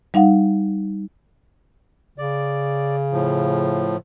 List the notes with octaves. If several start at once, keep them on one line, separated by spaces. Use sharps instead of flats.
G3 D#4 F5 F#5
C#3 D5
A2 F3